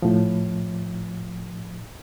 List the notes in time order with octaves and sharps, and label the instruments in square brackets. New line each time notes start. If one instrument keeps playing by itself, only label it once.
[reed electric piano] A2 F3